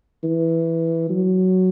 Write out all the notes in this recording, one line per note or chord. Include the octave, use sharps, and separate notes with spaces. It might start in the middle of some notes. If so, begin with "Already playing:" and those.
E3
F#3